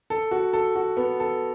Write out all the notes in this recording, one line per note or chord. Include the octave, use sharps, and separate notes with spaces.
A4
F#4
A4
F#4
B3
A4